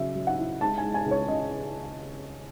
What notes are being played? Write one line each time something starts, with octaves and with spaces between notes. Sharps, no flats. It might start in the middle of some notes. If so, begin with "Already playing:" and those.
Already playing: C#3 F#3 E5
F#3
F#5
E4
G#3 A5
G#5
G#3
G#5
C#2
C#5
C#3 D#5